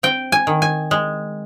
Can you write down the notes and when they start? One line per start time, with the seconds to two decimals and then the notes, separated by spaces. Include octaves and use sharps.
0.03 C4 G5
0.32 G#5
0.47 D#3
0.62 G#5
0.91 G#3